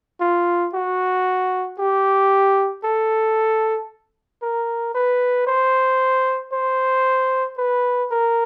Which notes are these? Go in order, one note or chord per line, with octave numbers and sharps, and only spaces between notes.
F4
F#4
G4
A4
A#4
B4
C5
C5
B4
A#4